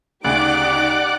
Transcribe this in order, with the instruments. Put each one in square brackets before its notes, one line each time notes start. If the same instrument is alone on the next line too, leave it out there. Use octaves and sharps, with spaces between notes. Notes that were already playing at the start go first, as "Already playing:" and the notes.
[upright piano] D2 C#3 [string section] D#4 G4 D6 [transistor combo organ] D5 F#5